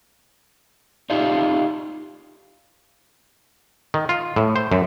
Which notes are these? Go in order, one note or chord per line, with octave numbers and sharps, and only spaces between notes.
D4 D#4 F4 G4
D#3
F4
A2
C5
F#2